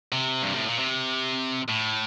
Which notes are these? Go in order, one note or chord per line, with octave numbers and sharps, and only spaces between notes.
C3
G2
A2
A#2
C3
A2